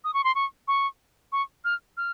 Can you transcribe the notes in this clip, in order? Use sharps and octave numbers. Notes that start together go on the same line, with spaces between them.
D#6
C#6
C6
C#6
C#6
C#6
F6
F6